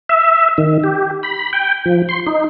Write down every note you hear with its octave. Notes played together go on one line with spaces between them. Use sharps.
E5
D#3
G4
B5
G5
F3
C6
D#4